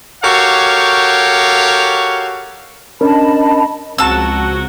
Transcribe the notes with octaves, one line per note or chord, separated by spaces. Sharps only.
F#4 G4 A4 A#4 C#5 F5
C#4 D4 A#4 D#5 A5 B5
C#2 F3 F#3 C4 F#4 A5 E6